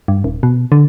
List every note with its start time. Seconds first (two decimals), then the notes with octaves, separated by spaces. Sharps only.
0.08 G2
0.24 D#1
0.43 B2
0.72 D3